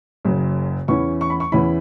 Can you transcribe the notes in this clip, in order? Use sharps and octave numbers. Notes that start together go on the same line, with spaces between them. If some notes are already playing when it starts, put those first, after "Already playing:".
F#1 F#2 C#3
E2 E3 C#4 E4 C#6
C#6
B5
C#6
E2 E3 C#4 E4 B5